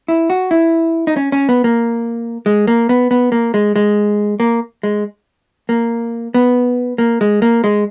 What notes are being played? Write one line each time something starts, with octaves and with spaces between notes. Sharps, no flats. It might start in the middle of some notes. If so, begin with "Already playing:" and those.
E4
F#4
E4
D#4
C#4
C#4
B3
A#3
G#3
A#3
B3
B3
A#3
G#3
G#3
A#3
G#3
A#3
B3
A#3
G#3
A#3
G#3